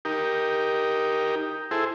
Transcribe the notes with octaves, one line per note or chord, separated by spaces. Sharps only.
D#4 G4 A#4
E4 G#4 A4 C5